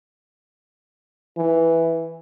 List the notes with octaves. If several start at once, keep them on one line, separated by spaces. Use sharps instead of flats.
E3